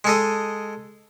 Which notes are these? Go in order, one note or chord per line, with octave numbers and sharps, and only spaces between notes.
G#3 A4 D#5